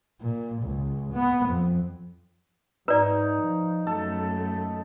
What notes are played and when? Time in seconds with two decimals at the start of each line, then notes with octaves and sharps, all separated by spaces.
0.21 A#2
0.63 C#2
1.13 B3
1.49 F2
2.88 G#2 D#4 B4 D5
3.42 F3
3.87 F#2 A3 A4